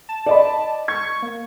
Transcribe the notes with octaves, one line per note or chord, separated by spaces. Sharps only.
A5
D5 D#5 B5
C#6 G#6
A#3